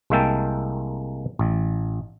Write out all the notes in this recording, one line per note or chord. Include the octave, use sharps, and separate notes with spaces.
C2 G#3 A#3 E5 G5 A5
A1